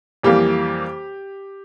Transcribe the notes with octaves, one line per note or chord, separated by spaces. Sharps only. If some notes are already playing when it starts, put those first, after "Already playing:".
F2 E3 G3 A#3 G4